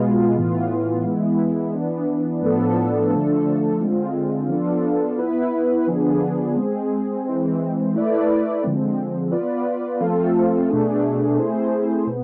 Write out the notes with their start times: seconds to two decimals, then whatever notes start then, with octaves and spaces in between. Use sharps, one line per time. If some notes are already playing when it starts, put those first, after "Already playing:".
Already playing: B2 G#3 B3 F4
0.36 A2 E3 B3 F4
1.04 E3 G#3 B3 E4
1.74 E3 B3 D4
2.42 A2 F3 B3 D4 A4
3.11 D3 F3 A3 D4 A4
3.80 D3 G#3 C4 F4
4.49 F3 B3 D4 F4 A4
5.18 B3 E4 B4
5.87 D3 F3 B3 D4 G#4
6.55 G#3 C4 G#4
7.25 E3 G#3 C4
7.94 A3 E4 B4 D5
8.63 D3 F3 G#3 C4
9.31 B3 F4 B4 D5
10.00 F3 A3 C4 F4 A4
10.69 B2 A3 D4 G#4
11.38 A3 C4 E4 G#4 C5
12.07 B2 B3